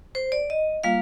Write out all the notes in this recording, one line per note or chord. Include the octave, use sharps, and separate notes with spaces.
C5
D5
D#5
G3 A#3 F4 F5